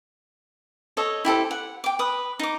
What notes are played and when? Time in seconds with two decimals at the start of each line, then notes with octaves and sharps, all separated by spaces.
0.97 A4 C#5 D#5
1.25 E4 G4 A4 C5
1.51 F#5
1.84 G5 D6
1.99 B4 D#6
2.39 D#4 D6